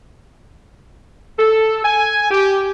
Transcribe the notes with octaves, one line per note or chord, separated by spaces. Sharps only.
A4
G#5
G4